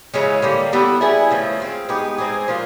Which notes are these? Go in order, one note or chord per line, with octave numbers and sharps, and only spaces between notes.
C#3 E3 G#3 C#4
D3 G3 A#3 C#4
G3 B3 E4 A4
G3 B3 E4 G#4
C#3 F3 A3
G#3 C4 F4
G#3 B3 D#4 G4
G#3 C4 D#4 G#4
F3 A#3 D4 F4